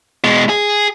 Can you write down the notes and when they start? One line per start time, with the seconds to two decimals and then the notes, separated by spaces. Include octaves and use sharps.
0.24 B2 G#3
0.49 G#4